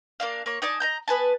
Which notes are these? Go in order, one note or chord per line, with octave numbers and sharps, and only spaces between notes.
A#3 D4 F5
A#3 C#5
D#4 D5 G#5 A5
D#5 A#5 G6
B3 B4 G#5 A5